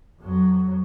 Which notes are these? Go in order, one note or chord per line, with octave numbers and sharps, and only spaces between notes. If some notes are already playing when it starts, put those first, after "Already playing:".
F2 F#3